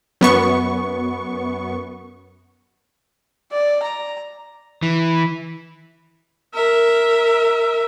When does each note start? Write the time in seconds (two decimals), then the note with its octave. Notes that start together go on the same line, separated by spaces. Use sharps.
0.21 F#2 B3 C#6
3.52 D5
3.82 A#5
4.83 E3
6.54 A#4 E5